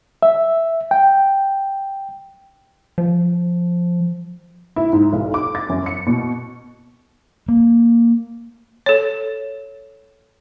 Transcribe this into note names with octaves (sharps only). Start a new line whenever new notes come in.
E5
G5
F3
E4
G#2
B1
D6
A6
F#2
C#7
B2
A#3
A4 C#5